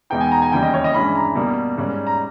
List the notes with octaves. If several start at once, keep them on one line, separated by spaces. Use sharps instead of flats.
E2 B2 G#3 B3 D#4 G5
G#5
A#5
G#5
D#2 C#3 E3 G3 G5
D#5
C#5
D#5
G2 E3 G#3 C#4 B5
A#5
B2 G3 A#3
G#2 G3 C#4
A#5